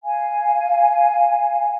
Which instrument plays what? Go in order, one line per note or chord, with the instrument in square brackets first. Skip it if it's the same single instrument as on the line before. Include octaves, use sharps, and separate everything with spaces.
[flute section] F5 G#5